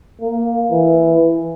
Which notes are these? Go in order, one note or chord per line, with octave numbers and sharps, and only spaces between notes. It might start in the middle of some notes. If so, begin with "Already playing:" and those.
A#3
E3